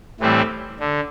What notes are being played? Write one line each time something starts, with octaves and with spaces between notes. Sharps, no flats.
A2 E3 G3 C4 E4
D3